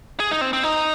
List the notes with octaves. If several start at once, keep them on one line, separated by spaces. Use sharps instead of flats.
G#4
D#4
C4
C4
D#4